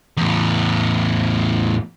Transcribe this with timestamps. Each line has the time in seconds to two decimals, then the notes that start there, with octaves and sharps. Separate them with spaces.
0.17 E2 A2